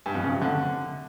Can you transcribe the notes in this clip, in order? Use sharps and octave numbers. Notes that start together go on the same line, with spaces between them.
G2
F2
C#3
C3
D3